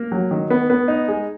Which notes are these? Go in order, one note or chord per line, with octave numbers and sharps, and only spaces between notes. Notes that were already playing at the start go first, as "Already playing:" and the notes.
Already playing: A#3
F#3
D#3
B3
B3
D#4
G#3